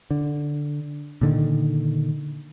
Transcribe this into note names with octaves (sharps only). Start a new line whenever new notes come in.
D3
A#2 D3 D#3